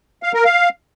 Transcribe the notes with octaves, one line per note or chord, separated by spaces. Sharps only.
F5
A#4
F5